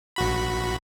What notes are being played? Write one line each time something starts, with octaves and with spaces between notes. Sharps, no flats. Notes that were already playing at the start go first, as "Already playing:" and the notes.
A#1 F#4 B5